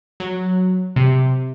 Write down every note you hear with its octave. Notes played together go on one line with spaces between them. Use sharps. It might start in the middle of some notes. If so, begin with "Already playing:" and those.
F#3
C3